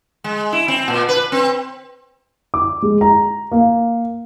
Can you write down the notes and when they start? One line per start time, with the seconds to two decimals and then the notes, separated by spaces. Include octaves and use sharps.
0.24 G#3
0.53 E4
0.68 C4
0.88 A#2
1.09 B4
1.32 C4
2.54 D6
2.82 G#3
3.01 A#5
3.52 A#3